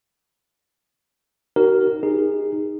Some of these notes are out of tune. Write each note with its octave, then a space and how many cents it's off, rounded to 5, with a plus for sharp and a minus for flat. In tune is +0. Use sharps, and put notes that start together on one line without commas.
D#4 +0 F#4 +45 A#4 +0
D#4 -5 G#4 -25